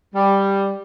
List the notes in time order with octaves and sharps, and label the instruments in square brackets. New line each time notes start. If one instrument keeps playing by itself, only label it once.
[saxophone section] G3